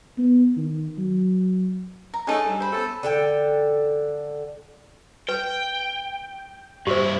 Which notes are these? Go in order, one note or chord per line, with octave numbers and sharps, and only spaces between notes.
B3
D#3
F#3
A#5
A3 C#4 D#4 G#4 A4
G2
C5 B5
B3 C#4 A4
D3 A4 G5
B4 G5
G2 E4 G4 C5